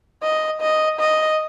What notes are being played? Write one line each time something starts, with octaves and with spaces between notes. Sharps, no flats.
D#5
D#5
D#5